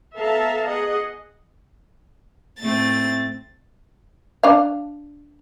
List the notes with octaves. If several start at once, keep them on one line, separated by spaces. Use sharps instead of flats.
B3 A4 E5 F5 A5 A#5
G#4 D#5 F#5
A2 A3 C4 A6
D4 F5